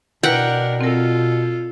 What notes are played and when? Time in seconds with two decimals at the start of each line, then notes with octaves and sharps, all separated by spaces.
0.23 B2 D4 E4 A#4 B4 F#5 G5
0.81 C4 F4 A4 A#4